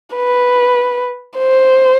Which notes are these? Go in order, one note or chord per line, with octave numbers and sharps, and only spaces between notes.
B4
C5